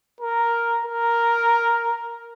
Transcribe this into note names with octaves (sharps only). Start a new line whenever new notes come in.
A#4
A#4